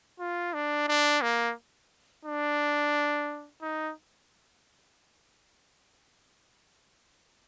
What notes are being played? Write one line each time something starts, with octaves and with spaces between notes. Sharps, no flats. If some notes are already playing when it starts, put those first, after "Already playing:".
F4
D4
D4
A#3
D4
D#4